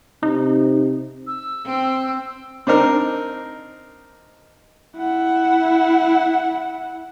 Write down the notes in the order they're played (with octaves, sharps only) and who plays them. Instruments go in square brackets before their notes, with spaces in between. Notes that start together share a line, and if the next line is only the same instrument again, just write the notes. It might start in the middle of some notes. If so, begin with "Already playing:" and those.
[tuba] C3 [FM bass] D#4
[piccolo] E6
[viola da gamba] C4
[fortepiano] C4 D4 D#4 A#4
[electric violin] E4 F#5